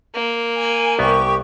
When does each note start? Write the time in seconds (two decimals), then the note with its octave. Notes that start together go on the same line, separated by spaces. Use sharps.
0.15 A#3
0.56 G#5
0.99 C2 B3 G4 C#6